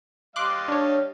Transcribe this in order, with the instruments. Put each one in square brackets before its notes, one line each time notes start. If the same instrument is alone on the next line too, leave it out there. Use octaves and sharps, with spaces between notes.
[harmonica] G3 D#5 F5 [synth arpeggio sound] C6 D6 F#6
[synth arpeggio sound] D4 C#5